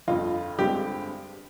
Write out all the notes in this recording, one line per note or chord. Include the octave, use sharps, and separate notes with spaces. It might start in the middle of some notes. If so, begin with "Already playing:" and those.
G1 F2 D3 F4
G1 G2 D3 G#3 C4 G4